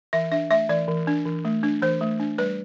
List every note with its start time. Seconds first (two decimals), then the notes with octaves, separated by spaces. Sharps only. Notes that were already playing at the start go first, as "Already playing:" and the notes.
0.13 E3 E5
0.32 D4 E5
0.50 A3 E5
0.69 E3 D5
0.88 E3
1.07 D4
1.26 E3
1.45 A3
1.63 D4
1.82 E3 C5
2.01 A3
2.20 D4
2.38 G3 B4